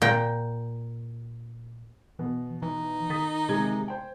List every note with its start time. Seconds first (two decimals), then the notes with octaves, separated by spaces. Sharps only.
0.02 A#2 G5
2.19 B2 E3
2.62 E3 D#4
3.10 D#3 D#6 A6 B6
3.49 C3 G#3 G#6
3.88 C5 G5